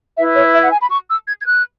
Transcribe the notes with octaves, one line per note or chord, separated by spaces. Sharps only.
E4 B4 E5
C#5
E5
F#5
G#5
B5
C#6
E6
G#6
G#6
F#6